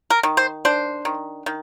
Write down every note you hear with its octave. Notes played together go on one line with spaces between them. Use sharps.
A#4
D#3
C5
D4 C5
D#3
D#3